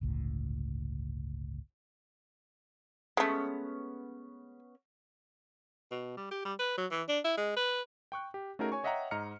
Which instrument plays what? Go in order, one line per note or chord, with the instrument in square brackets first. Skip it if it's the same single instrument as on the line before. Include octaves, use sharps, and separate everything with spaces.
[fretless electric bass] G1 C#2 A2
[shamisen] G#3 A3 [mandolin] B3 C#4
[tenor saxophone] B2
G3
G4
G3
B4
F#3
E3
D4
E4
G#3
B4
[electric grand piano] G5 C#6 F#6
G4
A3 C#4 D#4 F#4 G#4 A#4
C#5 G#5 C#6
C#5 D#5 E5 F#5 G5 A#5
G#2 D#5 A#5 F6 C#7